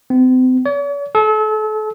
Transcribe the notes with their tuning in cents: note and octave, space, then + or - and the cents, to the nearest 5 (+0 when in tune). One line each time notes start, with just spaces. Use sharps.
C4 -40
C#5 +45
A4 -35